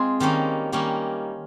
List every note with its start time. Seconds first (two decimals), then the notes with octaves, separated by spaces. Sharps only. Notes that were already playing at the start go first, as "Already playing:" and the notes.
Already playing: G#3 C4 F4 G#4
0.20 D#3 G3 A#3 C#4
0.72 D#3 G3 A#3 C#4